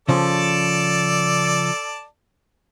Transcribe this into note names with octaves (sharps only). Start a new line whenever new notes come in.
C#3 F3 A4 D5 A5